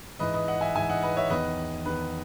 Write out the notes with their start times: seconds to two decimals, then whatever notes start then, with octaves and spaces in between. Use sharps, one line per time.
0.19 G#2 E3 B4 D#5
0.33 B4 D#5
0.48 D#5 F#5
0.61 E5 G#5
0.75 G#2 E3 E5 G#5
0.89 D#5 F#5
1.02 B4 D#5
1.17 C#5 E5
1.30 E2 D#3 B4 D#5
1.86 E2 D#3 B4